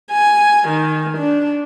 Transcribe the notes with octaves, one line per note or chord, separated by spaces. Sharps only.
G#5
D#3
D4